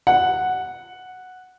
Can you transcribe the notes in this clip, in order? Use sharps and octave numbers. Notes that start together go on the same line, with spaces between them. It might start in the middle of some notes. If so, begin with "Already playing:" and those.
F#5